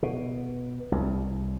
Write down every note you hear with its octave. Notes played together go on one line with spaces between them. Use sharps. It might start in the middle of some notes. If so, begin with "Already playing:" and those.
B2
C2